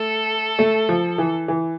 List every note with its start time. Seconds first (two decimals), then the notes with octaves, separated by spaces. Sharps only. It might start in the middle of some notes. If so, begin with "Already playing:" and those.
Already playing: A3 A4
0.59 A3
0.89 F3
1.18 E3
1.48 E3